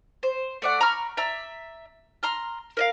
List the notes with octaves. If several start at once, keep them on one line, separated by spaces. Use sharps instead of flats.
C5
A3 D5 F#5
A#5 B5 C#6 F6
D5 E5 A#5 E6
A#5 C6 F6
A#4 D#5 F5